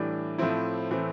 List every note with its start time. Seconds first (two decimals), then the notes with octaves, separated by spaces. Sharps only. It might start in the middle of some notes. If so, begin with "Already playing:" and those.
Already playing: A2 E3 G3 D4
0.38 A2 F3 A3 C4 E4
0.91 A2 E3 A3 C4